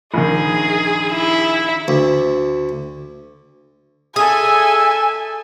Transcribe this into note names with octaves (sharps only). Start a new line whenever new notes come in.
A#1 D#3 G#4
E4
D2
G#4 A4 E5 G#5